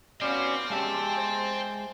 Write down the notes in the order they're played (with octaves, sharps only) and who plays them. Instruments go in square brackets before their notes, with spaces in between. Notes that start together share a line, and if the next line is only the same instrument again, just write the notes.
[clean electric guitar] B3 C#4 [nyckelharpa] F#4 F5 [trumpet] D5 [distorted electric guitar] G5 C6
[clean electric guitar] G#3 E5 [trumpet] G4 [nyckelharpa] A5
[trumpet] C5